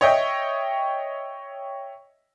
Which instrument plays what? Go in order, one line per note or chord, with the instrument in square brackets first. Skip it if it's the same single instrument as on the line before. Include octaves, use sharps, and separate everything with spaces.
[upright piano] C#5 D#5 E5 G5